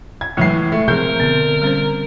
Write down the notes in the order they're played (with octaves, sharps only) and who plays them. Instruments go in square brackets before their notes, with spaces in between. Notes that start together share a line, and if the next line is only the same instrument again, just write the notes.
[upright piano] G#6
[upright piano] A2 E3 C7 [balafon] F#3 G#3
[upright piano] A3
[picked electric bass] C3 F3 C4 [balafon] G#4 [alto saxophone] A#4 [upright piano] G6
[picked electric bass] B2 D3 C4 [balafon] B3
[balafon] G3 C#4 C5